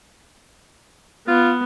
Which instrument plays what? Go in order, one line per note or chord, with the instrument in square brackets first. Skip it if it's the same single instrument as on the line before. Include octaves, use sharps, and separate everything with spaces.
[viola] B3 [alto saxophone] F4